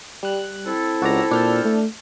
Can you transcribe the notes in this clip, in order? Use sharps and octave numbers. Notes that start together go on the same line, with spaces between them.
G3 F#6
C4 E4 A4
C#2 F#4 D5 A#5
A#2 D4 F6 G6
A3